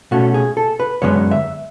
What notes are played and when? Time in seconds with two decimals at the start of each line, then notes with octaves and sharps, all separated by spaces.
0.11 B2 A3 C#4 F#4
0.34 G#4
0.57 A4
0.80 B4
1.02 F#2 D3 G#3 B3 C#5
1.31 E5